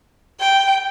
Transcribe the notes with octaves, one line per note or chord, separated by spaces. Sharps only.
G5